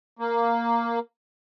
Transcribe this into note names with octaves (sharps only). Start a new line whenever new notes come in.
A#3